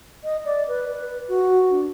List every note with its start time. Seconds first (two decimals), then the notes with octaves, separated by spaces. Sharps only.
0.24 D#5
0.45 D5
0.68 B4
0.92 B4
1.28 F#4
1.70 D4